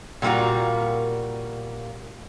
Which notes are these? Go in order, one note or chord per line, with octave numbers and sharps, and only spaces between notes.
A#2 G3 A#3 F4 F#4